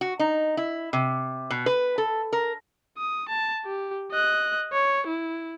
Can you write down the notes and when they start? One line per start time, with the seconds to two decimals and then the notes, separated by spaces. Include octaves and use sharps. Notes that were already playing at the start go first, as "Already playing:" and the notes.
0.01 F#4
0.19 D#4
0.57 E4
0.93 C3
1.50 B2
1.66 B4
1.98 A4
2.33 A#4
2.98 D#6
3.28 A5
3.65 G4
4.11 D#5 F#6
4.73 C#5
5.07 E4